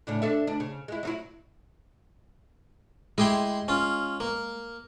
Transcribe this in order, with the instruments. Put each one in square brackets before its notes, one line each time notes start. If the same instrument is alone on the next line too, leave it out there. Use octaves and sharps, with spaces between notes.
[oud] A2 C#3 D4
D4 A4 E5
D2 D4
C#3
G#3 E4
F#3 D#4 E4
[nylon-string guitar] G#3 [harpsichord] E4 G4 C6
[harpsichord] C#4 F4
A#3